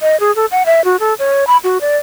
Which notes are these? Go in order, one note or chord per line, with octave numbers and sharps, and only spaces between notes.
D#5
G#4
A4
F#5
E5
F#4
A4
C#5
B5
F#4
D5